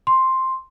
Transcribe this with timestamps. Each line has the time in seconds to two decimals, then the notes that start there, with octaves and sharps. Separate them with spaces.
0.07 C6